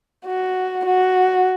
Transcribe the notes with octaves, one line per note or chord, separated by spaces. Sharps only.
F#4
F#4